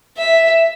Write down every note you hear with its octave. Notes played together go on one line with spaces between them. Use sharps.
E5